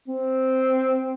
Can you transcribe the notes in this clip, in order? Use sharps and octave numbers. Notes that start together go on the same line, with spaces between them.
C4